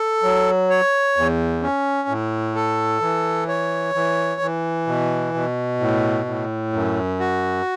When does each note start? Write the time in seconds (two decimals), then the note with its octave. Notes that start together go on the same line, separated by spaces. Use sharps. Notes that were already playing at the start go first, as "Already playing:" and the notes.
Already playing: A4
0.23 F#3
0.70 C#5
1.17 E2
1.62 C#4
2.09 A2
2.55 A4
3.01 E3
3.48 C#5
3.95 E3
4.41 E3
4.87 B2
5.34 B2
5.79 A2
6.26 A2
6.73 F#2
7.19 F#4